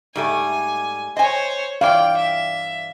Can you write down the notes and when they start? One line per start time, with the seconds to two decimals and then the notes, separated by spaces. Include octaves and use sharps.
0.16 G#2 G3 A3 G#5
1.17 C5 C#5 D#5 G#5
1.81 G2 E3 D5 F5 G5
2.17 E5